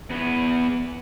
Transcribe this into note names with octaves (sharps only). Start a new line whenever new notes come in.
E2 B3